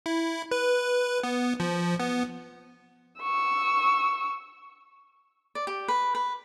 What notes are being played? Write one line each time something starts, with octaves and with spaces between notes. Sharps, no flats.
E4
B4
B3
F3
B3
C#6 E6
D5
G4
B4
B4